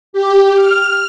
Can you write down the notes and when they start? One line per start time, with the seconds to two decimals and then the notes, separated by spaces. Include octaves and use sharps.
0.13 G4
0.55 F6